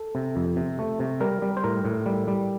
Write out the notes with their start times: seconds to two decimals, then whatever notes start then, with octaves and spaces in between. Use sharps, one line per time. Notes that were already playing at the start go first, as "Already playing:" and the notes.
Already playing: A4
0.15 C3
0.36 F2
0.56 C3
0.79 A3
1.00 C3
1.20 G3 A#4
1.42 G3
1.57 C5
1.64 A2 A#4
1.85 A2
2.06 G3
2.27 G3